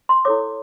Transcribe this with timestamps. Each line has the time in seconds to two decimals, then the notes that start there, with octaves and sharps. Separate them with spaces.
0.09 C6
0.25 E4 A4 C#5 D6